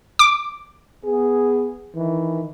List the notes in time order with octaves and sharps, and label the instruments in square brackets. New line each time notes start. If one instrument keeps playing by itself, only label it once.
[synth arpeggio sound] D6
[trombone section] B3 G#4
D#3 E3